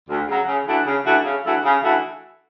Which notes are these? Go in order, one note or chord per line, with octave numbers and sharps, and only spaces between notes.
D2
C#3 F#3
C#3
E3 A3 D4 F#4
C#3
E3 A3 D4 F#4
C#3
E3 A3 D4 F#4
C#3
E3 A3 D4 F#4